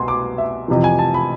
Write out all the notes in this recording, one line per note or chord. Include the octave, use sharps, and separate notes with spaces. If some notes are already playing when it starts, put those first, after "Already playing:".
Already playing: C2 B2 G#5 C6
D6
E5
F2 C3 E3
G#5
A5
B5